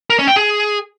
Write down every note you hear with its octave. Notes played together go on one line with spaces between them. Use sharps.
A#4
C#4
G5
G#4